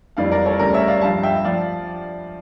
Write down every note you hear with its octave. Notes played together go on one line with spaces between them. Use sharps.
F2 E3 G3 D5 F5
A#4 D5
A4 C#5
D2 C#3 G3 A#4 D5
C#5 E5
D5 F5
G2 F3 F5 A5
E5 G5
F3 D5 F5